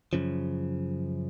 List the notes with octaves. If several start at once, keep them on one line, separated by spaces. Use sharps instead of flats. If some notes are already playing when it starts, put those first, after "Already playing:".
F#2 C#3 F3